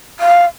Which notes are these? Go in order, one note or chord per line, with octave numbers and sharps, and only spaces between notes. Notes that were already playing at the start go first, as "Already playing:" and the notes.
F5